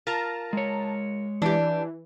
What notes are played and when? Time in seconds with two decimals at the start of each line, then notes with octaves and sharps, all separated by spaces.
0.07 F4 A#4 A5 A#5
0.53 G#3 C#5
1.42 E3 D4 G4